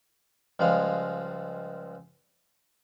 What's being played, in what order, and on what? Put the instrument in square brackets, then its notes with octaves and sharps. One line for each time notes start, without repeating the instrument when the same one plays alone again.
[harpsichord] C#2 F3 G3 G#3 F5